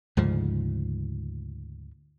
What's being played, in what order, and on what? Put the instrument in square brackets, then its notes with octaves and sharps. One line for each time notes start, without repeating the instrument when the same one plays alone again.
[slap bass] D2 G#2 C#3 F3